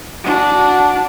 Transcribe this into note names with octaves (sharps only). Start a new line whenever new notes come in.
D4 F#4